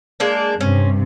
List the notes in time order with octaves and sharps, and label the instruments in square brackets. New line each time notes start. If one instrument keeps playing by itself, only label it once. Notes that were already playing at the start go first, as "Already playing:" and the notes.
[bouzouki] G#3 A#3 D4
[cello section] G2 C3 [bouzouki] C#4